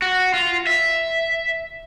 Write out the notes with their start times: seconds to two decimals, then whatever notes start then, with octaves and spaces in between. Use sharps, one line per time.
0.02 F#4
0.34 F4
0.67 E5